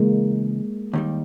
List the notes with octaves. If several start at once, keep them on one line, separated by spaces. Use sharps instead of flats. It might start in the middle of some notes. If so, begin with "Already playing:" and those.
Already playing: C#3 E3 G#3 A#3
D#2 D#3 G3